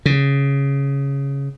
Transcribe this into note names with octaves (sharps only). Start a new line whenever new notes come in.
C#3